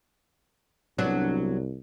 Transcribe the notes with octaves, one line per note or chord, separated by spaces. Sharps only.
C2 F#3 B3 D4